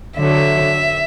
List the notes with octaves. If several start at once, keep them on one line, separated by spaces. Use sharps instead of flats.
D3 F#3 A3 E5